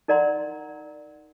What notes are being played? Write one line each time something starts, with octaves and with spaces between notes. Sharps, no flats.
D#4 A#4 D5 F#5 A#5 C6